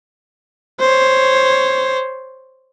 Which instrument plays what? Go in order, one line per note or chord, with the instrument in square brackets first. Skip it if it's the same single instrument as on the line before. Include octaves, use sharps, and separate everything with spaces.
[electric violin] C5 C#5